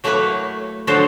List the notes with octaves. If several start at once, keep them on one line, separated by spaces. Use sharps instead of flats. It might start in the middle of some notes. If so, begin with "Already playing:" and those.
F#3 A3 A#3 E4 B4 C#5
D3 F3 F#3 F#4 A4 C5